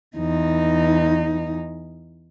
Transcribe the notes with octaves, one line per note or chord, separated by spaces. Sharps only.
E2 D#4